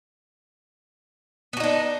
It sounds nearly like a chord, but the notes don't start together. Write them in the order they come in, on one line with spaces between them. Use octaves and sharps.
B3 F#4 D#4 D4